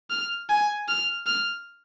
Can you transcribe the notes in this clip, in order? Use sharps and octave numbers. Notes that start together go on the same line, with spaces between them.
F6
G#5
F6
F6